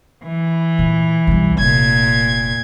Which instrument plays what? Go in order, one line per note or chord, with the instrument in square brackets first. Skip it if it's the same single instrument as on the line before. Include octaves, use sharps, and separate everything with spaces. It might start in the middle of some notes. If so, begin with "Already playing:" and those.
[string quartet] E3
[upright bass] A#2
B1 G3
[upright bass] F1 [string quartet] A#2 G#6